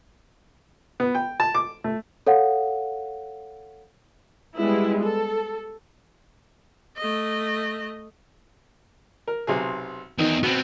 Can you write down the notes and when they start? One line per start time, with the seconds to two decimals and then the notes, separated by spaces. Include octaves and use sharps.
1.00 B3
1.15 G5
1.40 A5
1.55 D6
1.84 A3
2.27 A4 C#5 F5 F#5
4.55 G3 G#3 B3 E4
5.04 A4
6.97 A3 D#5
9.27 A#4
9.47 B1 C3 G#4
10.19 E2 D#3 D#4
10.43 B2 B3 C4